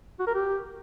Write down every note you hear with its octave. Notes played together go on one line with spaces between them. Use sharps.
F#4
A#4
G4